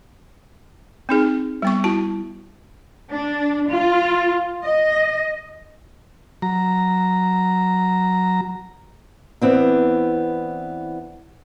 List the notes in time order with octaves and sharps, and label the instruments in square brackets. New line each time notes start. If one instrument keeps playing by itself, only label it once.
[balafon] C4 D#4 G#4
G3 B3 C#6
E4 F#4 A5
[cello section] D4
F4
D#5
[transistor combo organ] F#3 A#5
[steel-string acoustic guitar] E3 B3 C4 D4